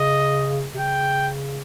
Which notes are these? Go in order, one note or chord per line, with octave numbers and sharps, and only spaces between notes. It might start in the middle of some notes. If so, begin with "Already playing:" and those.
Already playing: C#3 D#5
C3
C#3 G5